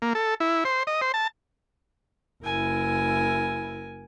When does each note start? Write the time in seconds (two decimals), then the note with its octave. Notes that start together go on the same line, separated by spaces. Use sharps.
0.02 A#3
0.15 A4
0.40 E4
0.65 C5
0.87 D#5
1.01 C5
1.14 A5
2.43 F#1 E4 A#4 G#5